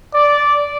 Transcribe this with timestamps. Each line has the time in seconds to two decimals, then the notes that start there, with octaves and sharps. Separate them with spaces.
0.14 D5